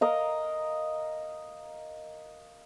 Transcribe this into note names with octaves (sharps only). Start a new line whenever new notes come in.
A#4 D#5 F5